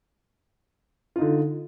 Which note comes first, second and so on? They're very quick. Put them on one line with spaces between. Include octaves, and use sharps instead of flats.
F4 D#4 D3